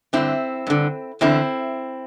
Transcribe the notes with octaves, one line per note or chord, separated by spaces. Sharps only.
G2 D3 C4 E4
G2 D3
E2 D3 C4 E4